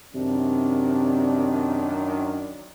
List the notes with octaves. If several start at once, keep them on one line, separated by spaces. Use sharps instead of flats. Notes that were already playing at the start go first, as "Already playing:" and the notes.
F#2 C3 D#3 D4